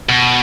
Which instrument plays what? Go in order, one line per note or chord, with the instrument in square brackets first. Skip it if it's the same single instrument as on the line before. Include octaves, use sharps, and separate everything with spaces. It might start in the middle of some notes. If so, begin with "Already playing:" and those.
[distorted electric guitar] B2